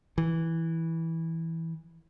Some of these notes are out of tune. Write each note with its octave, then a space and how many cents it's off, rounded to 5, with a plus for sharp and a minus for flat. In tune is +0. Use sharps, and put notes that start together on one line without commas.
E3 -10